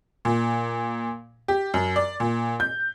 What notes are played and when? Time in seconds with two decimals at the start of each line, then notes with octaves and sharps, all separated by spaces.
0.25 A#2
1.48 G4
1.74 F#2
1.96 D5
2.20 A#2
2.60 G6